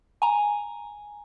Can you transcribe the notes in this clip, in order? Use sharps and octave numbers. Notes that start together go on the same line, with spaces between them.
G#5 A#5